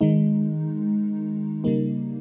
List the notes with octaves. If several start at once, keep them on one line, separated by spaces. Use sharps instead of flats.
D#3 G#3 D#4
C#3 G3 A#3 D#4